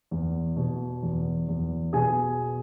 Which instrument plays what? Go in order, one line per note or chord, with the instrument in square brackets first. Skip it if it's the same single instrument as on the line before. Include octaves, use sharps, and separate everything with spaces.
[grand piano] E2
B2
E2
E2
B2 G#4 G#5